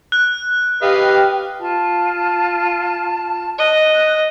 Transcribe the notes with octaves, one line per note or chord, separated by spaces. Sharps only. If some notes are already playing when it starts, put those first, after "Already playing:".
F#6
G4 B4 D#5 F5 G5
F4 A5
D#5 F#6